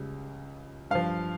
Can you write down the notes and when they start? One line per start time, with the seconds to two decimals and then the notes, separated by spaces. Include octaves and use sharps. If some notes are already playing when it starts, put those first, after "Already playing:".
Already playing: C#2 C#3 G3
0.91 G2 F3 F5